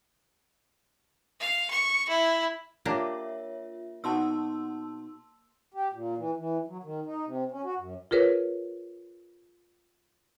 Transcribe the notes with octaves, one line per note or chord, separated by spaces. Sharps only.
F5
C#6
E4
A#3 D4 F4 G4 C#5 E5
B2 D#4 F#4 A5 C6 E6
G4
A#2
E3
E3
F#3
D#3
D#4
C3
C#4
F#4
F#2
F4 G#4 A#4 B4 C#5